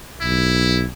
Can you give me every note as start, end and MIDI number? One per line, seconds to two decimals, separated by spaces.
0.21 0.87 35
0.21 0.84 64